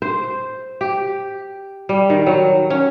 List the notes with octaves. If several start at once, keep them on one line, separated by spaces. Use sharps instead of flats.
C5
G4
G3
D#3
F#3
C#4